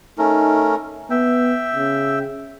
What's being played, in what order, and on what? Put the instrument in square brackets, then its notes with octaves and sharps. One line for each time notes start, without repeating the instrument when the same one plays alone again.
[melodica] A3 C#4 A#4 [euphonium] D#4
[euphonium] B3 [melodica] E5 G5
[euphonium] C#3